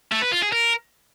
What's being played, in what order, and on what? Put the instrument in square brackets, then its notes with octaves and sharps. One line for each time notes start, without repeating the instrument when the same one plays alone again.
[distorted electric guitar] A3
B4
F4
G#4
A#4